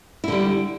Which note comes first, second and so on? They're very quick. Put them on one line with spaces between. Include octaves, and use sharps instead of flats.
E4 D3 G3